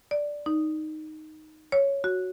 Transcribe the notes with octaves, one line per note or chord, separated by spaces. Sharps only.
D5
D#4
C#5
F#4